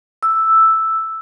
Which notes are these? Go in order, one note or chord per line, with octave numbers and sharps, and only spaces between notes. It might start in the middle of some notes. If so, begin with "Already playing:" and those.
E6